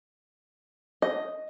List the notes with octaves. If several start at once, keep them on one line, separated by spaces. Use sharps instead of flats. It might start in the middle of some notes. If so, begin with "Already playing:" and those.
D#5